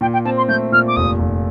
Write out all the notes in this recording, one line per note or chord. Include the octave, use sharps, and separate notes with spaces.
A#2 G5
G5
C4 A5
C6
A3 G6
A#2 F6
D6
F1 D#6
F1